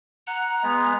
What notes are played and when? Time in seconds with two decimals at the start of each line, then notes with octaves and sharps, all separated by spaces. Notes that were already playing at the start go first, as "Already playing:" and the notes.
0.27 F#5 A#5
0.63 G#3 B3